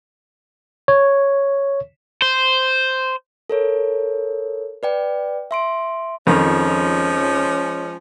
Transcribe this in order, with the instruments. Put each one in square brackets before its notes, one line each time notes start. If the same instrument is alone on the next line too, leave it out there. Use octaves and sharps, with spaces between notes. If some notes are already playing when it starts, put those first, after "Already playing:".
[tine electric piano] C#5
[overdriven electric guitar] C5
[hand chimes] A4 A#4 C#5
B4 D5 G5
E5 C6 D7
[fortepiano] F2 D#3 [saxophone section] F3 G#3 C#4